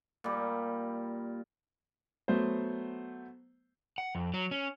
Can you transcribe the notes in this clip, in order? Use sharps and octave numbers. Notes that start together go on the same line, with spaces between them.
A#2 G3
F#3 A3 B3 C5
F#5
F2
F#3
C#4